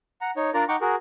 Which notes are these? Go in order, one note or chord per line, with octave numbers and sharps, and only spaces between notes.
F#5 A#5
D#4 C#5
D4 F4 A#4 D5 A#5
D#4 F#5 G5 A#5 C#6 D6
F#4 G#4 A#4